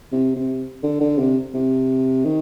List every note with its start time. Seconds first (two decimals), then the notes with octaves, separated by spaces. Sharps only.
0.12 C3
0.36 C3
0.83 D3
1.01 D3
1.18 C3
1.54 C3
2.25 D#3